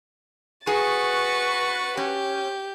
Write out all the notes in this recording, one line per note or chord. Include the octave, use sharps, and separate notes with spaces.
F#4 G#4 B4 C#6 A6
C#4 G4 G6